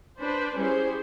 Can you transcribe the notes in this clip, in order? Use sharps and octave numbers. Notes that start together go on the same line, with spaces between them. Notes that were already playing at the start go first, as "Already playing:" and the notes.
D4 B4 C5
G3 C#4 E4 G#4 C5